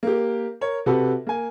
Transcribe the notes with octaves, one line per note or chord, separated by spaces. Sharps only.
A#3 G4
A#4 C#5
C3 F#4 G4 A4 B4
A#3 G#5